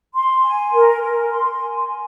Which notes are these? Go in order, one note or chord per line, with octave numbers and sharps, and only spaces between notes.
C6
G#5
A#4
A#4
C6
G#5
G#5